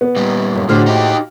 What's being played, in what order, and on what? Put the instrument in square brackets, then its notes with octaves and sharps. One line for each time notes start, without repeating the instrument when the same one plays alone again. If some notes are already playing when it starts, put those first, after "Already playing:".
[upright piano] B3
[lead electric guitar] A#2 G3
[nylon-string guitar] F#2
[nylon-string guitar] A2 G#4 C5 [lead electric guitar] D3 [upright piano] F#4 F6
[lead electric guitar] D#4 G4